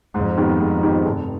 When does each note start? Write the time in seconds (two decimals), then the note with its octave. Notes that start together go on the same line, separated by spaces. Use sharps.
0.14 F2 G#2
0.37 D#3 B3 D#4 G4
0.60 G#2
0.83 D#3 B3 D#4 G4
1.05 F1 G2